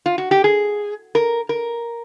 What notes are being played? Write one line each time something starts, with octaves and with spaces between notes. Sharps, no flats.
F4
F#4
G4
G#4
A#4
A#4